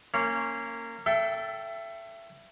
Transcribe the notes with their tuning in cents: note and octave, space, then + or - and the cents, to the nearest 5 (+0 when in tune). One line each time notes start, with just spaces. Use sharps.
A#3 -20 C#4 -15
A4 +0 E5 +25 G5 -20